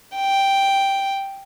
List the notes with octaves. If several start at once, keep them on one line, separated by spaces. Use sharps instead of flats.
G5